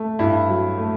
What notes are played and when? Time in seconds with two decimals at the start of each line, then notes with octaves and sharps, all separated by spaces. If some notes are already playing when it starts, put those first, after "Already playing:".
Already playing: A3
0.19 G2 E4
0.49 F#3
0.78 A3